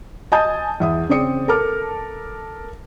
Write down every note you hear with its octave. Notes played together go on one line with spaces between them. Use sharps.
D#5 G#5 A5 D#6 G6 A6
E2 E5 D#6
C#3 C4 D5 D#6 C#7
A4 A#4 A5 D6 F6